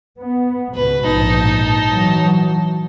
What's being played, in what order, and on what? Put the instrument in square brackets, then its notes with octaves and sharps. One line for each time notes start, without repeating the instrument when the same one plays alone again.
[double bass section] B3
[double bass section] C#2 G#2 B2 [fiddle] B4
[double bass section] A#1 G#2 [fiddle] D#4 A5
[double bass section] E3 F#3